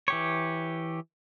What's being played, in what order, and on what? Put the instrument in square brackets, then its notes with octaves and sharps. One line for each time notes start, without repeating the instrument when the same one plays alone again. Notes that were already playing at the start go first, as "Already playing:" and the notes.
[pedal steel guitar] E3 G4 C#5